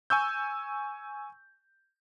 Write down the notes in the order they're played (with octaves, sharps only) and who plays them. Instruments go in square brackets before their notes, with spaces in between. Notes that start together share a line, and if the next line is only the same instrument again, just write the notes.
[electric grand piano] G#5 C#6 E6 G6